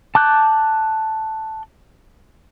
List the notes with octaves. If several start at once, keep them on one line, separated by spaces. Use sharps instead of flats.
A5 D6 F#6 G6